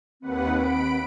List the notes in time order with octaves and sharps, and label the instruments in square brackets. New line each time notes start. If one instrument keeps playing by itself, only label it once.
[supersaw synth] D#2 B4 F#5 [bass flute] C4
[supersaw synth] B5 D7